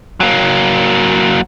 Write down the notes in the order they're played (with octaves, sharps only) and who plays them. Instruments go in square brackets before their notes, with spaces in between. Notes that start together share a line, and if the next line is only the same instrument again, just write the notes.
[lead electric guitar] F#3 A#3